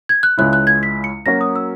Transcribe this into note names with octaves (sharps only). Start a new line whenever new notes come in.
G#6
F#6
C#2 C#3 G#3 C#4 E4 F#6
F#6
G#6
B6
C#7
F#3 A#3 C#4 F#4 A#6
D#6
E6